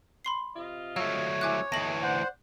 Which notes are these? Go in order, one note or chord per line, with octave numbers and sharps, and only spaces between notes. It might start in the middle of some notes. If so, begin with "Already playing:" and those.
B5 C6 C7
C3 F4 D#5
F#3 A3 C#5 F5 E6
C3 E4 G#5 D6 F#6
D2 E3 A3 B3 D#5 A#6 F#7
C5 D5 F#5